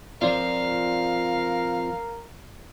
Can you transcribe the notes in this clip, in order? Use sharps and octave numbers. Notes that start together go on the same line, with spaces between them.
F3 C4 F4 A#4 D5 F5